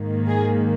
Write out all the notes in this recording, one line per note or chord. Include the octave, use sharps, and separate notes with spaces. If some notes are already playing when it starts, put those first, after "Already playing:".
Already playing: G#2 D#3 A#3
G#4